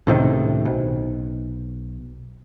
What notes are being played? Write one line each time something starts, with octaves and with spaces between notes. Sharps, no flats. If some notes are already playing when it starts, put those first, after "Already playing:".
C#2 A2 C3 D#3
B1